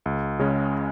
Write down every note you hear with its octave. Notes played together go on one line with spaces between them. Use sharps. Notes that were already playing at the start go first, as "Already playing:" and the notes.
C#2
C#3 G#3 C#4